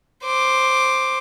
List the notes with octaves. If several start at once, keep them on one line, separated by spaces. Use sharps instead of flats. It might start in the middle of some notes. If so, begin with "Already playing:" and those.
C5 D6